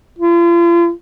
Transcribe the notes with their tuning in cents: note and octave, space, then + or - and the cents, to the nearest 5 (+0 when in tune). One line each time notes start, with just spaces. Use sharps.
F4 -40